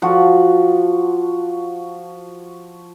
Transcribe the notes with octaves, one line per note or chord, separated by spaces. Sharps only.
F3 F#4